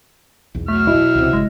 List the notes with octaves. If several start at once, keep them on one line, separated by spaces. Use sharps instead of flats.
B1 E2
F#3 A3 E5 F6
B2 E4
C#2 C3
G1 C#3 G#3